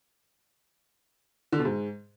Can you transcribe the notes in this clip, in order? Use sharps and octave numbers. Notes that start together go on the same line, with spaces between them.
D3
B2
G#2